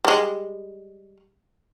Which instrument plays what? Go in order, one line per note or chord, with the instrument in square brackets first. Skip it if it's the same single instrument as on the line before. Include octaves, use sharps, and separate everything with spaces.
[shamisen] G3 G#3